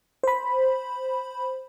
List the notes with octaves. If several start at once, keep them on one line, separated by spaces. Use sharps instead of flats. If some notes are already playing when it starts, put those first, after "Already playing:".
C5 B5